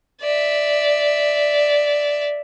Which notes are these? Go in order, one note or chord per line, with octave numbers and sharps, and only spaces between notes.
D5 E5